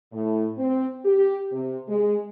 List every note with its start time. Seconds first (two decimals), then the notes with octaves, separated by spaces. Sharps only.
0.13 A2
0.58 C4
1.05 G4
1.53 C3
1.89 G#3